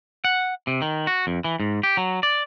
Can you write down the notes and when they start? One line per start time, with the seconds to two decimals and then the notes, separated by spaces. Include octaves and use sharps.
0.25 F#5
0.67 C3
0.82 D#3
1.07 F#4
1.27 F2
1.44 E3
1.60 G#2
1.83 G4
1.97 F#3
2.23 D5